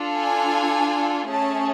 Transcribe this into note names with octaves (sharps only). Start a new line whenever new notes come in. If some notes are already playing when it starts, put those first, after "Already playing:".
Already playing: D4 F4 A4
G#5
A3 C#4 G#4 A5